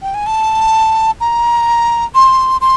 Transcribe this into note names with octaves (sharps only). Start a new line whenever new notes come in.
G5
G#5
A5
A#5
C6
C6